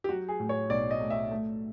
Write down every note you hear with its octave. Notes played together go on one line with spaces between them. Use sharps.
G4
F#3 F#4
G#4
A2
C#5
B1 D5
D#5
A3
E5
A3